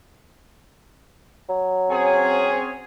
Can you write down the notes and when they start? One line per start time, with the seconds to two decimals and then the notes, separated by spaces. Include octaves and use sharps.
1.49 F#3
1.89 C4 C#4 G#4